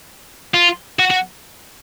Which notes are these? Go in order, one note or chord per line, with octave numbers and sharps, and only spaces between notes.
F4
F#4
F#4